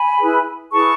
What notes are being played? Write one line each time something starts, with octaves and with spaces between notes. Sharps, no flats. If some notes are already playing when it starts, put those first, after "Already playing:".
Already playing: G#5 B5
E4 G#4 B4
E4 G#4 B4 A5 C#6